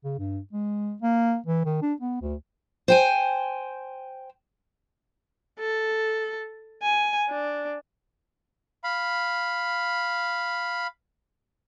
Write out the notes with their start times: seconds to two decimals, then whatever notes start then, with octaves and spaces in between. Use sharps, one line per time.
0.04 C#3
0.19 G2
0.53 G#3
1.02 A#3
1.46 E3
1.65 D#3
1.82 D4
2.01 B3
2.21 D2
2.88 C5 G5 G#5
5.59 A4
6.83 G#5
7.29 D4
8.84 F5 B5